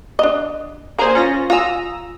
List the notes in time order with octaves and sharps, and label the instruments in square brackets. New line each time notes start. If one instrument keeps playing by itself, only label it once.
[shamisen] D4 D#5
[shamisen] D3 A#5 [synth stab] A#3 G#4 C5
[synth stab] C#4 F4 A#6
[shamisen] F4 G#5 [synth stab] A#5 D#6 E6